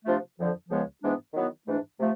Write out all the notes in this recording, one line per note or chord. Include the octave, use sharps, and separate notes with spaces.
C3 F3 A3 D4 F4
F2 D3 F3
C#2 C#3 F3 G#3 B3
G#2 E3 G#3 B3 D4
D#3 F#3 B3 E4
G#2 E3 A3 D4
C3 F3 A3